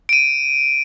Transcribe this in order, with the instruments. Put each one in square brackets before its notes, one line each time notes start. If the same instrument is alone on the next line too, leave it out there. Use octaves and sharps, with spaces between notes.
[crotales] D7 D#7